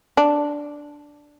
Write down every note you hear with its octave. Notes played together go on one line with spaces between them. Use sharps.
D4